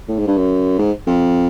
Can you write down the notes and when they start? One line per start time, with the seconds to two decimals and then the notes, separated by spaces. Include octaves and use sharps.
0.08 A2
0.18 G#2
0.28 G2
0.37 F#2
0.79 G#2
1.07 F2